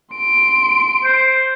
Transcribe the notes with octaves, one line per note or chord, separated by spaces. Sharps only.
C6 D7
C5